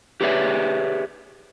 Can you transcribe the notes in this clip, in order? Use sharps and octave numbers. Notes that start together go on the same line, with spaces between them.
G4 G#4 B4 C#5 D5 E5